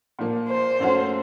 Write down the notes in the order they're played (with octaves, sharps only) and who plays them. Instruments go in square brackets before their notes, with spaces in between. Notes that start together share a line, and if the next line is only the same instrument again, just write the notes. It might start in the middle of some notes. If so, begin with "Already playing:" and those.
[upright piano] A#2 F3 A#3
[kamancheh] C5
[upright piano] F#2 F3 A3 C#4 F#4